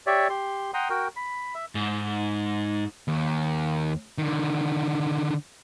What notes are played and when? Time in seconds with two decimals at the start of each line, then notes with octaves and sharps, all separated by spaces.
0.07 G4 C#5 D5 E5
0.30 G4 C6
0.74 F#5 G5 A#5 C6 D#6
0.90 F#4 A#4 G5
1.16 B5
1.55 E5
1.75 G#2
3.08 D#2
4.18 D3 D#3